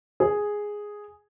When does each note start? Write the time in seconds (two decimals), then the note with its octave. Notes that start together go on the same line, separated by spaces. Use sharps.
0.20 G#4